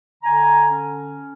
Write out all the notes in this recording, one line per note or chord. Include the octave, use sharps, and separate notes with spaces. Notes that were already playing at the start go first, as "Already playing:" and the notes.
D3 G#5 A#5
C#4